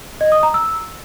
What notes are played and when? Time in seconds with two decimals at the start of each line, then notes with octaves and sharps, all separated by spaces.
0.21 D#5
0.32 D#6
0.43 A#5
0.54 E6